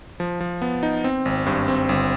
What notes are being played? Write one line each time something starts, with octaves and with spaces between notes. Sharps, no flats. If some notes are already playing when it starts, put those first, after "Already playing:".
F3
F3
B3
D#4
C4
G#1
G2
C4
G1